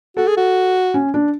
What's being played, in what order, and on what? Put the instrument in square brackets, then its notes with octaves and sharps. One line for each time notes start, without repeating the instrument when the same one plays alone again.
[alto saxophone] F#4 [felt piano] A4
[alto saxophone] G#4
F#4
[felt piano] C#4
D4